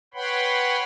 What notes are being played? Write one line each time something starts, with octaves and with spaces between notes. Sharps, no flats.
B4 C#5 F#5 G5 B5 C6